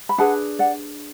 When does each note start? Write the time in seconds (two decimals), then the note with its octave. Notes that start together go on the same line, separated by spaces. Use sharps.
0.09 B5
0.18 D4 G#4 B4 F#5 A5
0.59 D5 F#5